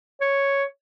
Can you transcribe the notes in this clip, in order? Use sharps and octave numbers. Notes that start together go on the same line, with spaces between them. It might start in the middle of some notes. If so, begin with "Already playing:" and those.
C#5